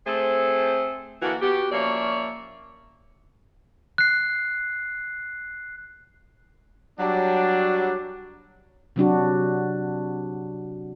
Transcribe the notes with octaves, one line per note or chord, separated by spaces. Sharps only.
A3 C4 G#4 A4 C5
D3 E3 A#3 F#4
B3 F#4 G4
F3 A#3 C#4 C#5 D5 E5
F#6 C7
F#3 G3 D4
C3 F#3 D4 F#4